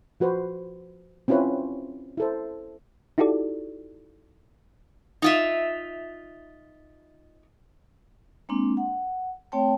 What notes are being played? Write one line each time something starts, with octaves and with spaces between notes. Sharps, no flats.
F3 F#4 B4 C5
C4 C#4 E4 F4 B4 C#5
E4 A4 C5
D#4 E4 F#4 G4 A4 D5
D#4 F4 E5
G#3 A#3 C4 D4
F#5
A3 C4 C#5 G5 A5